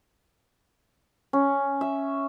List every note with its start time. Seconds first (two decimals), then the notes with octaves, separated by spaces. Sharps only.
1.33 C#4
1.81 E5